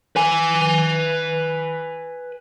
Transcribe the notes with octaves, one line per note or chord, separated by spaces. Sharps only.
B4 G#5